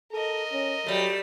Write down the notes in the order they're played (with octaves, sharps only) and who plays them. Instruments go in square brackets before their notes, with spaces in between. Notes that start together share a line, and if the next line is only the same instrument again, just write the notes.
[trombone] A4 [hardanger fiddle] A#4 D#5
[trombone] C#4
[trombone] F#3 [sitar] G3 A3